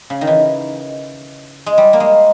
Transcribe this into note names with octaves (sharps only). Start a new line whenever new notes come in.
C#3
D#3
E3
G#3
G3
A#3
G#3